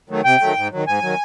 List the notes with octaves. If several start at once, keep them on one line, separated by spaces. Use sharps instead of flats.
D#3 F#3 A3
C3 G5
D#3 F#3 A3
G#2
D#3 F#3
G#2 G#5
D#3 F#3